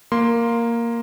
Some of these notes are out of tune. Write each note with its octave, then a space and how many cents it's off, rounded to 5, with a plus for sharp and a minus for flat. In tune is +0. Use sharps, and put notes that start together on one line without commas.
A#3 +0 C6 +0